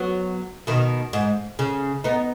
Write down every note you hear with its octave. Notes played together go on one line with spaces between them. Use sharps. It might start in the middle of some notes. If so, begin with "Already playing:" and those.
Already playing: F#3 B3
B2 D#3
G#2
C#3
B3 D#4